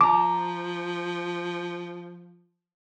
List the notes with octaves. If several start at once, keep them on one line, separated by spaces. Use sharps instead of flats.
F3 A5 A#5 D6